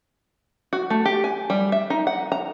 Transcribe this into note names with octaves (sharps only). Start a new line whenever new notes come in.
F#4
A3
G4
G#5
G3
E5
D#4
F#5
A#5